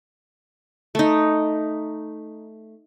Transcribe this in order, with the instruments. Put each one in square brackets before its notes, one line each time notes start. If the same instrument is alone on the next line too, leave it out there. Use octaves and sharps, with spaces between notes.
[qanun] A3 D#4